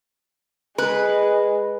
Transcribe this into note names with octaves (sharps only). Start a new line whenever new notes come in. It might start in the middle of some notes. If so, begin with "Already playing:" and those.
G#3 B4